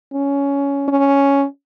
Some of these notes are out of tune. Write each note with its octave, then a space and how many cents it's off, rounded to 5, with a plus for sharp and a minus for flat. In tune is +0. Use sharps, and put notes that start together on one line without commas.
C#4 +15
C#4 +5